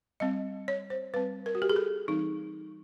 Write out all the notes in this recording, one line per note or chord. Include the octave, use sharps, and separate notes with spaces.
G3 C4 D#5
C#5
C5
G3 C4 B4
A#4
F#4
G4
G#4
A4
E3 G3 C4 D#4